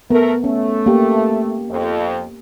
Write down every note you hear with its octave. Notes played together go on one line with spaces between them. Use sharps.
A3 B3 A4 A#4
A3 C#4
A#3 G4
F2